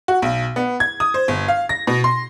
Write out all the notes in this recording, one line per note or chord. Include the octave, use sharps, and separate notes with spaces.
F#4
B1
B3
G#6
D#6
C5
G1
F5
A#6
B2
C6